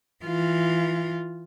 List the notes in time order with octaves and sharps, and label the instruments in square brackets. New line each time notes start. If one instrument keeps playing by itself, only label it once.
[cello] E3 F4